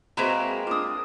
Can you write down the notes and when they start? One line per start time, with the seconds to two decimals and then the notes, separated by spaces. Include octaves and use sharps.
0.17 G#3 A#3 C4 F#4 B4 C5 E5 A#5
0.67 D4 F4 D6 D#6